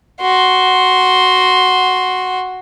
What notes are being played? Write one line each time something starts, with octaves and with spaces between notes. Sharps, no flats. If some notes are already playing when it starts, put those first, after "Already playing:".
F#4 C6